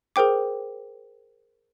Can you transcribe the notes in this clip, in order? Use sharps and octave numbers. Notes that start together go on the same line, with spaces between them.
G#4 A#4 C5 G5 D6